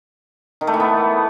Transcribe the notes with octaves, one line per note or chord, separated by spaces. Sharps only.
D#3
A3
E3
B3